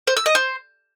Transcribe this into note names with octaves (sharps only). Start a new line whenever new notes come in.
C5
E6
D#5
C5